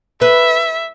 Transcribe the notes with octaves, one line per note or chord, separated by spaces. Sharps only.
B4 E5